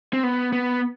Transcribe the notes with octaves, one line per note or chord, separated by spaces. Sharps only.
C4
B3
B3